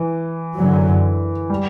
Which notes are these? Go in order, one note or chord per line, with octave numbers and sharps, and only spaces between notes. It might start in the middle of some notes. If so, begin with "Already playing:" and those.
Already playing: E3
F#2 D3 F#3
G3